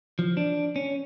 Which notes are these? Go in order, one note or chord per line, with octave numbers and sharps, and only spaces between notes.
F3
D4
C#4